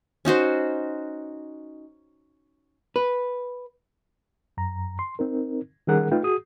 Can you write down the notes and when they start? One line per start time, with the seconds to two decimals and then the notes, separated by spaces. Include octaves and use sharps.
0.25 C#4 D#4 F#4 C5
2.96 B4
4.57 F#2 A#5
4.99 C6
5.19 C4 D#4 A#4
5.87 D#3 G3 C#4 G#4 A#4 F#5
6.12 A3 D#4 F4 B4 F5 G5
6.23 F#4 G#4 D#6